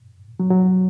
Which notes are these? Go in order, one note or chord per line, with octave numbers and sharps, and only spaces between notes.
F#3
F#3